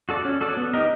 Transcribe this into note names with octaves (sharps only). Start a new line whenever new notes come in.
F#4 A4 D5
C#4
F#4 A4 D5
B3
D#4 G4 A#4 D#5